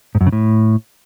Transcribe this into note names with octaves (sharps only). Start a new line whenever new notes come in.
G#2
F#2
C#3
A2